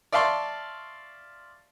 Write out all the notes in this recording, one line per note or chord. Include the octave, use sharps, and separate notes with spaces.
D5 E5 F5 A5 C6 C#6